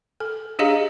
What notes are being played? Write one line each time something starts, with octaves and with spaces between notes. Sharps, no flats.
A4
D4 G4 G#4 D#5 F5 A#5